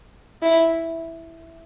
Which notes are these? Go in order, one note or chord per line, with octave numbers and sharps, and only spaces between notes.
E4